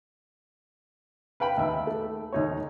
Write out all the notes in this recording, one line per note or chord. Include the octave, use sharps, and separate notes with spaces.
B4 F5 G5 B5
D#2 E5
A3
D#2 D#4 C#5